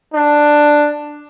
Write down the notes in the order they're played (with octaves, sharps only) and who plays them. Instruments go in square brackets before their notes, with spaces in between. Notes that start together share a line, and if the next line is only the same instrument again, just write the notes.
[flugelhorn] D4